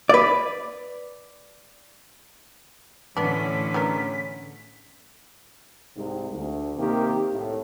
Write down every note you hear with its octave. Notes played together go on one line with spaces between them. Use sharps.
B4 D5
A2 D3 E3 B3 C#4 D4 B6
C#3 B3 A#4
C2 G#2 C3
D2
C3 D#3 A#3 G4
C2 A2